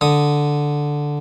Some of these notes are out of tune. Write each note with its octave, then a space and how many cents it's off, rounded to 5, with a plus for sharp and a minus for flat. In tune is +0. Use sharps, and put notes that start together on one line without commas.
D3 +0 D#6 +0